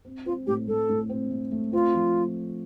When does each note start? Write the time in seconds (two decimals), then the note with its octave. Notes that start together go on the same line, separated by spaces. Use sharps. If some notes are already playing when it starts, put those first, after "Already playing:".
0.05 C4
0.26 C4 F4
0.47 A2 G4
0.68 A2 A4
0.89 A2
1.09 C4
1.30 A3
1.51 A3
1.72 C4 F4
1.94 F3